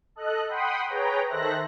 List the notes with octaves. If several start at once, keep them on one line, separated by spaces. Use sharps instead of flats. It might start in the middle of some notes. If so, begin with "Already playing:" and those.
A4 D#5 F#6
F#5 G5 B5 C6 D#6
G#4 B4 C#5 G5 A#5
D#3 A4 C5 E5 F#6 A#6